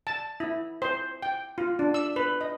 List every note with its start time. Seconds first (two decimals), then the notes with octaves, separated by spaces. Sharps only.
0.07 A5
0.40 E4
0.82 C5
1.23 G5
1.58 F4
1.79 D4
1.94 E6
2.16 B4
2.41 D#5